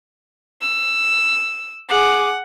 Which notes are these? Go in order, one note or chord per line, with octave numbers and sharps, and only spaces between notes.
E6
G#4 F#5 D6